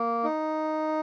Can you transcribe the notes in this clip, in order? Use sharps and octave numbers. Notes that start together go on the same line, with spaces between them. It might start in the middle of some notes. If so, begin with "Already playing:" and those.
Already playing: A#3
D#4